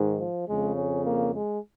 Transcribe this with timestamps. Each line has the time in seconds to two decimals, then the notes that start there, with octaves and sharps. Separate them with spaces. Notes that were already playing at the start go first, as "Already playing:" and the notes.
Already playing: G#2 D#3
0.19 F3
0.48 F2 C#3 G#3
0.76 C#4
1.04 A#3
1.33 G#3